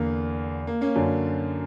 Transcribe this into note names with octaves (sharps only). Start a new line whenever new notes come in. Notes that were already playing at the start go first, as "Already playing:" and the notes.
Already playing: E2 D3 A#3
A#3
A#3 C#4
F#2 D3